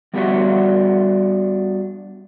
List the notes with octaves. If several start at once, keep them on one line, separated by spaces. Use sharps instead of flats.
G3 B3 D4 F#4 E5 F#5